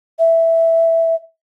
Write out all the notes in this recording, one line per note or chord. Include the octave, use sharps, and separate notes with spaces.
E5